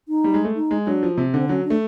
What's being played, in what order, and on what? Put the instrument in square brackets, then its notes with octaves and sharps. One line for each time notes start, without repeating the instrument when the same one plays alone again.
[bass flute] D#4
[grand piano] G3
G#3
A3
[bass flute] D#4
[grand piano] G#3
[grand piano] F#3 [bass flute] D4
[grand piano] F3
C3
[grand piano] D3 [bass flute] C4
[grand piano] F#3 [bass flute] C#4
[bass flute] D4
[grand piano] A3